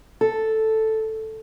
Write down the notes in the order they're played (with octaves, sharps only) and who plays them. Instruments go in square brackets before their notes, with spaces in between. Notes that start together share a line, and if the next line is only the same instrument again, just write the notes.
[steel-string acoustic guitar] A4